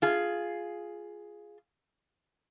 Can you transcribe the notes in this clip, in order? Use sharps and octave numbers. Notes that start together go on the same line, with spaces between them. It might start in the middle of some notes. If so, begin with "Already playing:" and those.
F4 G#4